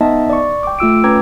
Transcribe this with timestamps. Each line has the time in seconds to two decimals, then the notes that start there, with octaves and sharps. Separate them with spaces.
0.01 B3 D#4 D#5 E5 A5
0.30 D5 C#6
0.63 G5 D6
0.79 A3 F4 E6 D7
1.04 C#4 B4 G5 A#5 D6 G#6